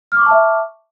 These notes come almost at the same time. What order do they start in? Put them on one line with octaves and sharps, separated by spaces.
F6 D6 C#6 A5 E5